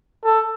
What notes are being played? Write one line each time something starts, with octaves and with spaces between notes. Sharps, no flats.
A4